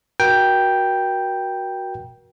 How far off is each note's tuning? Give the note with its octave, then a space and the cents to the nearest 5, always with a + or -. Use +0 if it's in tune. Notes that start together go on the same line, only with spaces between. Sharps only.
F#4 +0 A#4 +35 G5 +0